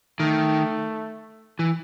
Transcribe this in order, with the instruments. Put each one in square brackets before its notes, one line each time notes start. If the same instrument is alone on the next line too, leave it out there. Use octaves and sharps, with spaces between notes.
[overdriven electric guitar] D#3 [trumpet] A3
[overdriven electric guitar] E3